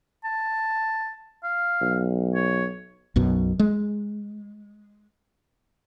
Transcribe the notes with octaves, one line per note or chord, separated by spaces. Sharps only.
A5
F5
B1
C#5
B1 F#2 B2
G#3